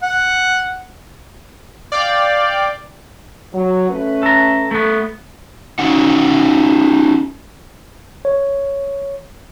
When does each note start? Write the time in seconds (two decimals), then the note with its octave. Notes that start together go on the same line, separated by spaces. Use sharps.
0.03 F#5
1.92 D5 F5 G5
3.53 F#3
3.90 A3 C#4 B4
4.23 A4 A#5
4.71 A3 B3
5.79 C#4 D#4 F#4 F#5
8.25 C#5